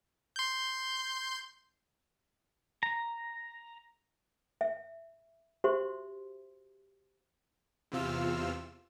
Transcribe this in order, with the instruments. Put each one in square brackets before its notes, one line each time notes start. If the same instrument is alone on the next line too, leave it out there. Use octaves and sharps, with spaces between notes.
[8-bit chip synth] C6 G6
[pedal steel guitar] A#5
[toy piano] E5
F#4 G4 C5 E5 C6
[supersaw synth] E2 C3 F4 E6 F6